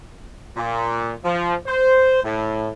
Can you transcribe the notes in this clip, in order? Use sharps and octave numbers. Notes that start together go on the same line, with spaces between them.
A#2
F3
C5
A2